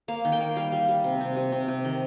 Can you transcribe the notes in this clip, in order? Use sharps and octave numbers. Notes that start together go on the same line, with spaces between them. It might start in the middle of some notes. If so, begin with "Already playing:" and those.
A#3 F5
D#3
G5
A#3
G3 F5
G3
G3
C3
C3
C3
C3
C3
D#3